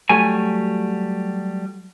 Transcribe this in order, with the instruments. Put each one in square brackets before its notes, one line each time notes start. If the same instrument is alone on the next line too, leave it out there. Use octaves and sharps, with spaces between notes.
[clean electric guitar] F#3 G3 A3 G#5